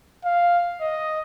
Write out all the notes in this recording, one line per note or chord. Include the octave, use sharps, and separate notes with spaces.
F5
D#5